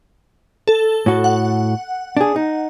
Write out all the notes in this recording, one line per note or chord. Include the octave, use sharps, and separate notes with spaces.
A4
A2 F#4
F#5
D4 G#4
D#4